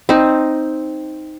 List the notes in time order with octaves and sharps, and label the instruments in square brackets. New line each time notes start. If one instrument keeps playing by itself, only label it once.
[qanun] C4 D#4